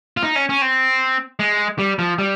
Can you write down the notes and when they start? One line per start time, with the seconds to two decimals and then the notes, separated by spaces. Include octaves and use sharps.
0.17 F4
0.23 D#4
0.36 C#4
0.49 C#4
0.62 C4
1.40 G#3
1.79 G3
1.99 F3
2.19 G3